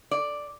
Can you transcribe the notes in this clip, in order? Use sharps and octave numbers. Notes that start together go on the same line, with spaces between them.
D5